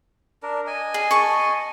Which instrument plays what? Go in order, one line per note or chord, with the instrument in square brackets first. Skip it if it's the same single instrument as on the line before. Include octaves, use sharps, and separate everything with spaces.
[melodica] D4 A#4
D#5 G#5
[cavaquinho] G#4
A5 C#6